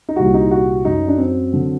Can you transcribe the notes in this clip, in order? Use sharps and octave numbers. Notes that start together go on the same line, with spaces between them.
D#4
C2 A#2 G3 F#4
D#4
F#4
F#2 F#3 D#4
D4
C4
D3 F#3